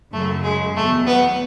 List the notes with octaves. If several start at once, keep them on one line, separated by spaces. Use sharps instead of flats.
F#2 C#3 F#3 A3
G#3
E2 B2 F#3 A3
B3